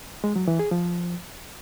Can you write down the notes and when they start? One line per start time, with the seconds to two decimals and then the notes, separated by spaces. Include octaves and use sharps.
0.24 G#3
0.36 F#3
0.48 E3
0.59 G#4
0.71 F3